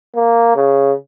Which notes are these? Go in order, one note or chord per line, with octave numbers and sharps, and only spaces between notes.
A#3
C#3